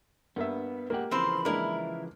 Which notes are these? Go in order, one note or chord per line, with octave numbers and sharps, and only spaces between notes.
G2 A#3 B3 E5
A#2 G#3 A#3 G4 F#5
C#3 E3 F3 C4 A#4 C5 B5
G#3 A#3 D4 E4 A#4